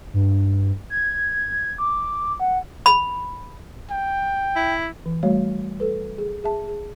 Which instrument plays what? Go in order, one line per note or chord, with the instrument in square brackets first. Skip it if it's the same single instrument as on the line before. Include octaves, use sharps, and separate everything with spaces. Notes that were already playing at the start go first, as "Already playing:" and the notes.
[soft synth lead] G2
G#6
D6
F#5
[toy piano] B5
[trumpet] G5
[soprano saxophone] E4
[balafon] E3
G3 A3 F#4 C#5 F5
A4 B4
G#4
G#4 E5 A5
G#4